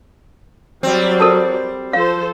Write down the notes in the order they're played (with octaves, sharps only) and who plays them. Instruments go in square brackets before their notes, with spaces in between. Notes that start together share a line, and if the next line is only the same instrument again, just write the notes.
[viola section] F#3 D5 [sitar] G3 C4
[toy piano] A4 A#4 A5
[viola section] F3 A4 C5 [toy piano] F5